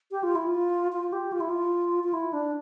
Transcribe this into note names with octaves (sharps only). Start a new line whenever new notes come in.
G4
F4
E4
F4
F4
G4
F4
E4
F4
F4
E4
D4